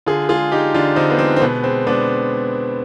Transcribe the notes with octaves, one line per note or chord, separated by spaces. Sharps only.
D3 F4 G#4
G#3 F4 G#4
G#3 D#4 G4
D3 D4 F4
D3 C4 D#4
B3
G#3 C4
C4
B2 B3
G#3 C4
G#3 B3 D4